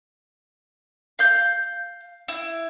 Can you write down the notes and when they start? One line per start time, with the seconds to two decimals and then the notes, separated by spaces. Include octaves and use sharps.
1.19 F5 G6
2.28 E4